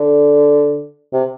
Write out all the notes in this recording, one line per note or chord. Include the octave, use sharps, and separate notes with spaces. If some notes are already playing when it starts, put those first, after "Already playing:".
Already playing: D3
C3